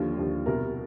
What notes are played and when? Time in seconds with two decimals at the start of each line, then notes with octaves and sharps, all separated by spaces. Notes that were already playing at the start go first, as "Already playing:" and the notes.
Already playing: D#2 D3 F3 F4
0.17 D#2 D3 F3
0.46 C2 B2 A#4